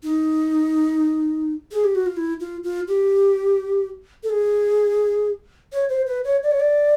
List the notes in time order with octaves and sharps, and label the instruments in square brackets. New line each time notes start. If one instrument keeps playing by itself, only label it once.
[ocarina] D#4
G#4
G4
F#4
F4
E4
F4
F4
G4
A4
G#4
C#5
C5
B4
C#5
D5
C#5
D5